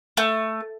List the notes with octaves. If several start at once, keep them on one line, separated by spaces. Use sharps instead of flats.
A3